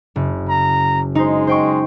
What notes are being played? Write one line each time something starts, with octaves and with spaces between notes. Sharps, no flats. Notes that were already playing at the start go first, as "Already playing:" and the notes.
F#1
A#5
G#3 D#4 C5
C5 G5 C#6